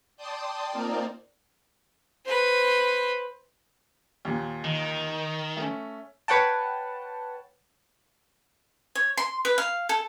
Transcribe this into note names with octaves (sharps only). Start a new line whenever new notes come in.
D5 G5 A5 C6 D#6
A#3 C4 D#4 F4 A#4 D5
B4 C5
D#2 A#2
D#3 D#5
A3 C#4
B4 C#5 F#5 G5 A5
C#5
C6
B4
F5
A4